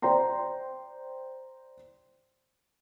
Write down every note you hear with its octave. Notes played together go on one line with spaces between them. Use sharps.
C5 D5 G5 A#5 C6